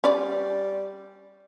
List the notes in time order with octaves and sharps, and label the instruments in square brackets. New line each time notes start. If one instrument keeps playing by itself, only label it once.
[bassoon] G3 [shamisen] C#4 B4 D5